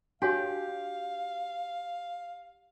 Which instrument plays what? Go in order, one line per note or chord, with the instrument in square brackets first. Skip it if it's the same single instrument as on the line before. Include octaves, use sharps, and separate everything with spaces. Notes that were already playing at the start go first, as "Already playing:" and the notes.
[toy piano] D4 F#4 C#5 [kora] G4 [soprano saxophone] F5